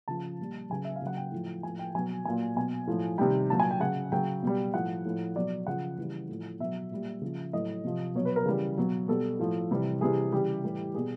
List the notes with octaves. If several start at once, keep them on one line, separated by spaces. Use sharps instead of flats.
C#3 F3 A5
A#2 G3
C#3 F#3 G#5
E5
F5
C#3 F#3 F#5
G5
A2 F3
A2 F3 G#5
G5
B2 F#3 G#5
A#2 F#3 G#5
B2 F#3 G#5
A2 F3
C3 D#3 G3 G5
A#2 F#3 A5
G#5
G5
C#3 F#3 F#5
C#3 F#3 G5
B2 G3
A2 F3 F#5
A2 F3
B2 F#3 D5
C#3 F3 F#5
C#3 E3 G3
A2 F3
B2 F#3 E5
A#2 G3
C#3 F3
A2 F#3 D#5
C3 F3
B2 F#3 C#5
B4
A#4
C#3 E3 G3
B2 F#3
B2 G3 A4
A2 F3
C3 E3 G3
C3 E3 G3 G#4
C#3 E3 G3 G4
A2 E3 G3
B2 G3 G#4